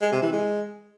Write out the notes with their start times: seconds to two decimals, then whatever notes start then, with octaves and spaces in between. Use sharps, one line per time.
0.02 G#3
0.12 C3
0.23 E3
0.33 G#3